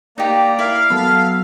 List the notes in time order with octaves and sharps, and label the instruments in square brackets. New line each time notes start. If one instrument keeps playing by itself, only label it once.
[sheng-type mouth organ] A#3 D5 A#5 [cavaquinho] D#4 G4
[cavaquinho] E4 A#4 [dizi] F5
[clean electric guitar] F#3 B3 [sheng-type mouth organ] A4 [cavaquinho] B5